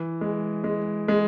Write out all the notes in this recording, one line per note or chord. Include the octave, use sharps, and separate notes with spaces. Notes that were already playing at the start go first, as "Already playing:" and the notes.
Already playing: E3
G#3
G#3
G#3